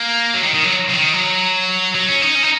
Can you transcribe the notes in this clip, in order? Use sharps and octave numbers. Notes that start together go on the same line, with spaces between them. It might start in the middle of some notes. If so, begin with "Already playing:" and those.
Already playing: A#3
F#3
D#3
D#3
F#3
C#3
D#3
F#3
F#3
C#4
D#4
C#4
D#4